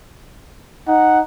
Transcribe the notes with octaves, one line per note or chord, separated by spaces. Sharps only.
D#4 F#5